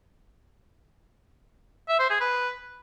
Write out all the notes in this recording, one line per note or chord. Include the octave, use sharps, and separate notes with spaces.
E5
C5
G#4
B4